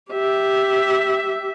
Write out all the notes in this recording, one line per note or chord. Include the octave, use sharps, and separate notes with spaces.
G4 E5